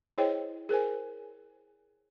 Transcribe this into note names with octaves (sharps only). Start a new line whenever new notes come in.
E4 G#4 C5 C#5 D#5 G5
G#4 A#4 C5 G#5